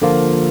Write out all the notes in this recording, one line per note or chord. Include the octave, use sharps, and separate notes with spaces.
D3 F3 A#3 F4